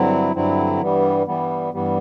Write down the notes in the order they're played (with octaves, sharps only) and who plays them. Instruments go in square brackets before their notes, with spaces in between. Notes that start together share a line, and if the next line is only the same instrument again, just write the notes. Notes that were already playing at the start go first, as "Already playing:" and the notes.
Already playing: [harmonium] G2 D3 F#3 C4 E4
G2 D3 F#3 C4 E4
G2 E3 G3 B3
G2 E3 G3 B3
G2 E3 G3 B3